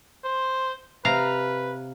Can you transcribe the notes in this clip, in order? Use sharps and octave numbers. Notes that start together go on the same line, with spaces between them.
C5
C3 B4 F5 A#5